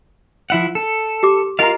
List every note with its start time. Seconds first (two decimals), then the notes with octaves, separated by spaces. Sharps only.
0.50 F3 E4 F#5
0.75 A4
1.23 G4 D6
1.59 F4 A#4 D#5 F5 A#5